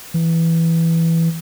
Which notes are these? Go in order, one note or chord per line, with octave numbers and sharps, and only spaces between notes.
E3